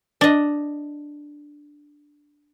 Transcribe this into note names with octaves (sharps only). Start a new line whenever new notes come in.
D4 D#5